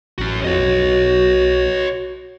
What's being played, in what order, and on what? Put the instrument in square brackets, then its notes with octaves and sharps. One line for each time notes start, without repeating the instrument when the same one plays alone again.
[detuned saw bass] A1 [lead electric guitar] C#4 F#4
[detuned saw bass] F2 [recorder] F#4 [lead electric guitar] C#5 D#5
[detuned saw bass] B1